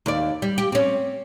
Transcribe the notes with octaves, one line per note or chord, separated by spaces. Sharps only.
D#2 D5
G3
G4
C4 C#4